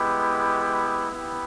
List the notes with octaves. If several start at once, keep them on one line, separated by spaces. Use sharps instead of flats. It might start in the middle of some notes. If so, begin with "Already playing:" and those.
Already playing: G#3 B3 E4 G4
B3 E4 G4